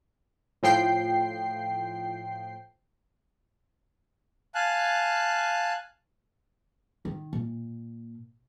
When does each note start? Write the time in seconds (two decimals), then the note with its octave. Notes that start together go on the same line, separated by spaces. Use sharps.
0.63 A2 F3 G5 C7
4.55 F5 G#5 A5 F#6
7.05 D#3
7.33 A#2